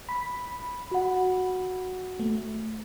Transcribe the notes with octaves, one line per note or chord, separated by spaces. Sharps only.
B5
F#4 F#5
A3